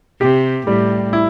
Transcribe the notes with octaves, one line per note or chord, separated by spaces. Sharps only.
C3 G4
A2 G3
E4